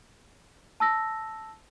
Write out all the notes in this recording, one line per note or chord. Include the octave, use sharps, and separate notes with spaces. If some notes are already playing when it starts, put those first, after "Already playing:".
A5 E6 A#6